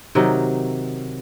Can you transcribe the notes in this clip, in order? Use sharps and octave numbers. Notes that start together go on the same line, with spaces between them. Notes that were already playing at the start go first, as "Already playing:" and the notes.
C3 D#3 F#3 D#4